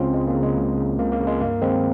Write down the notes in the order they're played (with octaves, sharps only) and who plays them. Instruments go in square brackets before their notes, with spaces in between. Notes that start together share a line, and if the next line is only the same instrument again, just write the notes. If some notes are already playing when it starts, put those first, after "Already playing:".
Already playing: [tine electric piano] C#2 C#3 G#3 C4 C#4 F4
C#2 G#3
A#3
C#3
G#3
C#2
C#3
C#2 A#3
A#3
C#3
G#3
G2 A#3
D#3 G#3 C4